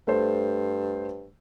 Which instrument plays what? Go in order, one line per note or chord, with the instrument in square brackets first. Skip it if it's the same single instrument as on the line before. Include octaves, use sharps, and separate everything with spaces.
[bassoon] G2 [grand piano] A3 C5